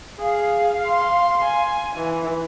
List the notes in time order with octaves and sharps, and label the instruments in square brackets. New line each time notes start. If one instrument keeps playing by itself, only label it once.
[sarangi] G#4 [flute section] F5
[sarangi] C6
G#5
E3